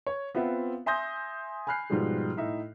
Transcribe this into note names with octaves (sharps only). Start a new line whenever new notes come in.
C#5
B3 C4 F4 E5 F#5
E5 G#5 C6 D#6 G6 A#6
G#5 B5 F6 F#6 C7
G#2 B2 F3 G3 G#4
A2 D#4 E5